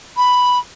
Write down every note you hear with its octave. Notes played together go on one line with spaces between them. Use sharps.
B5